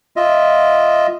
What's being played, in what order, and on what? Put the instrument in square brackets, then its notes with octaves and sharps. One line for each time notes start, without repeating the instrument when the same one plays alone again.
[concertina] F4 D#5 E5